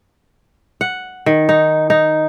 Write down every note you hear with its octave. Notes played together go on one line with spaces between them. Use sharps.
F#5
D#3
D#4
D#4